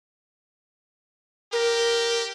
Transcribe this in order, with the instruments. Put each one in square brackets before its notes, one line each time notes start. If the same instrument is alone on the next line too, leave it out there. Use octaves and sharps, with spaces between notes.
[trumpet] G4 [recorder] A#4